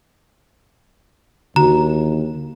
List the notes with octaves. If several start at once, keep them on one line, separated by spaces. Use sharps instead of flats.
D#2 D3 F#4 A#5